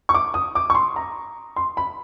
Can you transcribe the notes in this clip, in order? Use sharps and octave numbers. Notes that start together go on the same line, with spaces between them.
C#6
D6
D#6
D6
C#6
C6
A#5
C6
B5